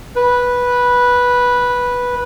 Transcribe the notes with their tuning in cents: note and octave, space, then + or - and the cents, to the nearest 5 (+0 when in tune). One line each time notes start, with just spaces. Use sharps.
B4 -10